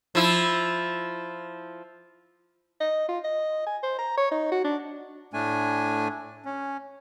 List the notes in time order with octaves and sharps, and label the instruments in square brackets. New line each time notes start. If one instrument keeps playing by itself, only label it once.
[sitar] F3 E4
[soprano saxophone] D#5
F4
D#5
G#5
C5
A#5
C#5
D#4
F#4
D4
[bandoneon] A2 A3 D4 G#5
C#4